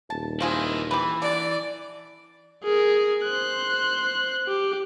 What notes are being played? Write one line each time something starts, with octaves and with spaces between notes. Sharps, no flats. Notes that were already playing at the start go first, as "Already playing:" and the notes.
D#1 A5
D#3 C4 E4 F4 G#4
E3 G4 B4
D3 D5
G#4 A#4
C5 F#6
G4